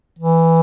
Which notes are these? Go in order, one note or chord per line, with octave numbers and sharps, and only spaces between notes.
E3